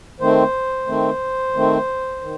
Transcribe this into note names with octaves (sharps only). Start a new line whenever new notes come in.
D#3 A3 C4 C5
D#3 A3 C4
D#3 A3 C4
D#3